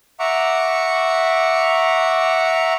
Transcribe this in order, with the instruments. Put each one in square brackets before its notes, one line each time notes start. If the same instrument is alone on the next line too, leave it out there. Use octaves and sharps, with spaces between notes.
[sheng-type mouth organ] E5 F#5 A#5 C#6 D6